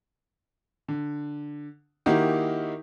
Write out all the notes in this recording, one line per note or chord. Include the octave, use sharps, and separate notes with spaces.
D3
D#3 A#3 D#4 E4 F#4 G4